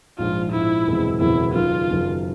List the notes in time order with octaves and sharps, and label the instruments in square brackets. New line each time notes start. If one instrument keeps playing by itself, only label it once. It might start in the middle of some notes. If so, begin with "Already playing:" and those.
[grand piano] A#1 G#2 F3 [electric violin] F4
[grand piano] A#1 G#2 F3 [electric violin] E4
[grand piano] F#1 E2 B2 G#3 C4
[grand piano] F#1 E2 B2 G#3 C4 [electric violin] E4
[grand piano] F#1 F#2 D#3 [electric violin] F4
[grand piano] F#1 F#2 D#3